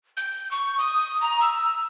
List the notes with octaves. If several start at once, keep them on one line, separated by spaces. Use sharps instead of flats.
G6
C#6
D#6
A#5
E6